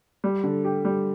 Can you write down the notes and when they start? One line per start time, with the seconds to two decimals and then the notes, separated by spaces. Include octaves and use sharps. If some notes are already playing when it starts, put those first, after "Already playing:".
0.24 G3
0.44 D3
0.65 G4
0.85 G3